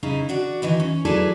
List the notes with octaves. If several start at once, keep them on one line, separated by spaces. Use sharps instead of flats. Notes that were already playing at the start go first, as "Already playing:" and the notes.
C#3 D#4 E4
D4 F#4 D5
D#3 E3 D#4 E4
C#4
F#3 E4 G#4 A4 B4 D5